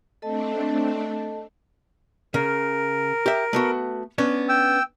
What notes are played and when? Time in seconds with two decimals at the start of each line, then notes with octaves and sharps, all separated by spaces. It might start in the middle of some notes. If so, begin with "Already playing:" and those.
0.22 A3 C4 D4 A4 D#5 A5
2.34 C#3 A#4
3.26 G4 E5
3.53 A3 B3 F#4
4.18 B3 C#4 D4
4.49 G5 E6